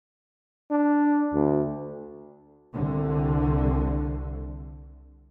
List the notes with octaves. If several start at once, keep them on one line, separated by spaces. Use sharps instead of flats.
D4
D2
C2 D3